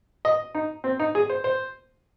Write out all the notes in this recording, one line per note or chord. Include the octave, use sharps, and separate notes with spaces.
D#5
D#4
C4
D#4
G#4
C5
C5